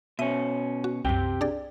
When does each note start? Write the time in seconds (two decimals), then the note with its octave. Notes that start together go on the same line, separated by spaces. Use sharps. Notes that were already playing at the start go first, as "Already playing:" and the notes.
0.19 B2 C#4 E5 D#7
0.84 F#4
1.05 C2 F#2 C3 G4 G5
1.41 D4 G#4 D5